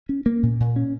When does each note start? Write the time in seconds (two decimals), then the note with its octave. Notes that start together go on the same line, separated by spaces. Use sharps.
0.09 C#4
0.26 A#3
0.43 A#2
0.60 A#2
0.76 C#4